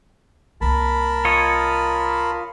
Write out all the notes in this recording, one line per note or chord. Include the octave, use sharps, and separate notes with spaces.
C2 A#3 A#4 A5 B5
F4 C#5 D#5